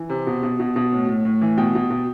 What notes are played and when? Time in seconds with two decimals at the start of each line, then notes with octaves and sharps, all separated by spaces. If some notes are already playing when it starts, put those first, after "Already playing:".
Already playing: E3
0.10 C3
0.27 B2
0.43 B2
0.60 B2
0.76 B2
0.93 A2
1.09 A2
1.25 A2
1.42 E3
1.58 B2 G5
1.75 B2
1.91 B2